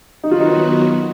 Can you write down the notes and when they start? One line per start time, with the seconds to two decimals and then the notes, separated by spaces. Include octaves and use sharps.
0.24 D#3 F#3 B3 D#4 F#4
0.31 F4
0.40 D#4